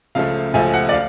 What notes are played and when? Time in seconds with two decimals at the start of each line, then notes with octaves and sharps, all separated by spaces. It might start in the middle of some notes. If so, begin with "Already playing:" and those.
0.15 C#2 C#3 F3 A3 F5
0.54 C#2 C#3 F3 A3 G#5
0.74 F#5
0.89 D5
0.93 F5